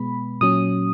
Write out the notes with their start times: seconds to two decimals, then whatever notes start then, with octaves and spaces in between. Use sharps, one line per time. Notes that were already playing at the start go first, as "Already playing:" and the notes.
Already playing: B2 G#3 B3 B5
0.41 A#2 F#3 C#4 D#6